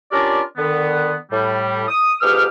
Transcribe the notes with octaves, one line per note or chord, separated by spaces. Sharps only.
C#4 D4 F4 G4 A#4 D5
D3 D#3 B3
A2 G3
D#6
F2 G#2 G4 B4 D#6 F6